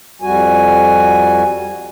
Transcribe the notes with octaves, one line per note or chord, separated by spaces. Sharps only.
F2 G3 F#4 G#5